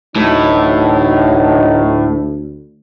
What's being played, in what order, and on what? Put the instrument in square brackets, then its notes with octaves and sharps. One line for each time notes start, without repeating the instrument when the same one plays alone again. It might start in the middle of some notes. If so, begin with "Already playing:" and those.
[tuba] D2 [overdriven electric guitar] A2 [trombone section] E3 F#3 D#4